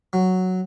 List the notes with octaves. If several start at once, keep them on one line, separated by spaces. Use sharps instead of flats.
F#3